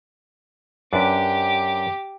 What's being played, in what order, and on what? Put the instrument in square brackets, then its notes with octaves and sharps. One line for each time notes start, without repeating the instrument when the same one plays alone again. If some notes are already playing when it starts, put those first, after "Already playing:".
[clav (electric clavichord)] F#2 D4 B4 [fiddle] G4 D6